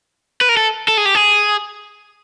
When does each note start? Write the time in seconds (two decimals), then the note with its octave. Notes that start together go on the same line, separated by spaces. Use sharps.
0.41 B4
0.49 A#4
0.57 A4
0.88 A4
0.97 G#4
1.05 G4
1.15 G#4